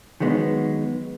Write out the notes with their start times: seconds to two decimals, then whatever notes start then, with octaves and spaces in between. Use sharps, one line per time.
0.20 D#3 F#3 G#3 B3